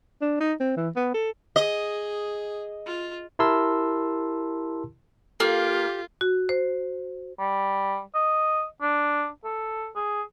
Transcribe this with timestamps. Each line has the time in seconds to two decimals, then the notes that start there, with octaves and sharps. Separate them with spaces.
0.21 D4
0.40 D#4
0.60 C4
0.77 E3
0.96 B3
1.14 A4
1.56 G#4 D#5
2.86 F4
3.39 E4 G4 A#4 A5 C6 E6
5.40 A#3 F4 G4 A4
6.21 F#4
6.49 C5
7.39 G3
8.15 D#5
8.82 D4
9.44 A4
9.96 G#4